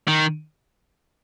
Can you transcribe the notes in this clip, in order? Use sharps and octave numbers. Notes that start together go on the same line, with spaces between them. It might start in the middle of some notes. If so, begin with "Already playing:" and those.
D#3